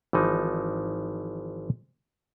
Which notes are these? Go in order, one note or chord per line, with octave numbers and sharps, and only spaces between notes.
G#1 E3 F3 D#4